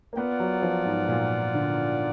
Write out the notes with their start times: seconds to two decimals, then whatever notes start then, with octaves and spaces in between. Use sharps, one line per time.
0.13 A#3
0.17 B3 F4 A#4 D5 F#5
0.40 F#3
0.62 F3
0.85 G#2
1.09 A#2
1.54 D3